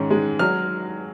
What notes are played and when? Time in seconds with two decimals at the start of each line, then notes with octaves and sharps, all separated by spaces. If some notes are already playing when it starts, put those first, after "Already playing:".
Already playing: G#2 D#3 C#4
0.10 G#3
0.39 F#3 F6